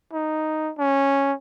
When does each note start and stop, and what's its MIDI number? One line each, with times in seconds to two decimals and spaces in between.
0.13 0.72 63
0.78 1.33 61